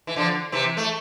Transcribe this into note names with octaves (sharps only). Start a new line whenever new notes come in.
E3
D3 F3
C3 E3
A3